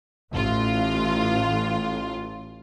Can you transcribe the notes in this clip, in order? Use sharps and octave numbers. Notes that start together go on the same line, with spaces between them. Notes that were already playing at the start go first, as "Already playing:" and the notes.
A1 F4